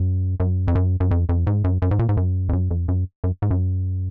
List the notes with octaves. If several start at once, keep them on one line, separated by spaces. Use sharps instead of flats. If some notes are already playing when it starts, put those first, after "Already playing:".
Already playing: F#2
F#2
F2
F#2
F#2
F2
F2
G#2
F#2
F#2
G#2
A#2
G#2
F#2
F2
F#2
F2
F#2
F#2
G#2
F#2